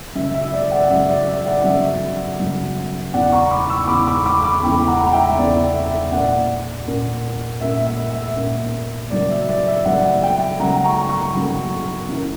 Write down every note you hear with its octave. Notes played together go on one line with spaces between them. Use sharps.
F#2 C#3 F#3 E5
E5
D5
D5 F#5
F#2 C#3 F#3 E5
D5
E5
D5 F#5
F#2 C#3 F#3 E5
F#2 C#3 F#3
E2 C#3 E3 D5 F#5
A#5 C#6
B5 D6
C#6 E6
E2 C#3 E3 B5 D6
B5 D6
B5 D6
B5 D6
E2 C#3 E3 G5 B5
F#5 A#5
A#5
E5 G5
E2 C#3 E3 D5
E5
A#2 A#3 C#4 D5 F#5
A#2 A#3 C#4
A#2 A#3 C#4 E5
E5
E5
A#2 A#3 C#4
C#3 F#3 A#3 D5
E5
D5
E5
C#3 F#3 A#3 D5 F#5
E5 G5
C#3 F#3 A#3 F#5 A#5
A#5 C#6
A#5 C#6
C#3 F#3 A#3
F#2 E3 A#3 C#4